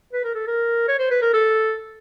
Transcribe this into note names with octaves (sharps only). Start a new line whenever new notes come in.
B4
A#4
A4
A#4
C#5
C5
B4
A#4
A4